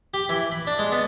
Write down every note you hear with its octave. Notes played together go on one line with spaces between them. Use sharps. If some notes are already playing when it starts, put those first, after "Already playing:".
G4
E3
B5
D4
G#3
B3